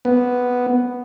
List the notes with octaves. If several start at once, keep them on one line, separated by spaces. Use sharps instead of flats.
B3